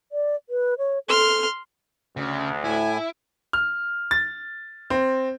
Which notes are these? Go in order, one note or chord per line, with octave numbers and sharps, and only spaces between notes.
D5
B4
C#5
A4 C6 F6
D2 C#3
A2 E4 G#5
F6
A6
C4